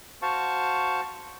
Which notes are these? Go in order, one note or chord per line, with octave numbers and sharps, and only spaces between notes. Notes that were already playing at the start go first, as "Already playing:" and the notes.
F#4 C5 F5 A5 C#6